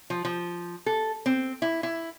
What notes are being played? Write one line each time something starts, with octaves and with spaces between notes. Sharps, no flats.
F3
F3
A4
C4
E4
E4